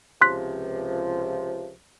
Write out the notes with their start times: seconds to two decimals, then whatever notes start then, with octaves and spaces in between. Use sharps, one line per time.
0.21 C#2 C3 F3 C6 F#6 B6